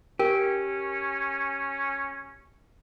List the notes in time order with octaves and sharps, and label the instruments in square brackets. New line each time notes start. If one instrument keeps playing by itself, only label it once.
[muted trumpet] C#4 [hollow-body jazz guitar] G4 [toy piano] A#4